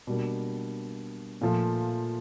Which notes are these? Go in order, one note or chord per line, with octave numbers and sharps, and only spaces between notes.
B2 G3 A#3 D4
A#2 F3 A3